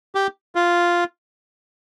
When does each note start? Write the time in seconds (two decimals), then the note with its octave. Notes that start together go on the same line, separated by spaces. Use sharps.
0.15 G4
0.55 F4